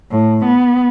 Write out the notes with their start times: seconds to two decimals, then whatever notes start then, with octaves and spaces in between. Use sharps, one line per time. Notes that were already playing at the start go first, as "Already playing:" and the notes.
0.11 A2
0.45 B3